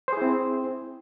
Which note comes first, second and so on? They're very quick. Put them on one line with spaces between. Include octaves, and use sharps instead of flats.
C5 G#4 E4 C4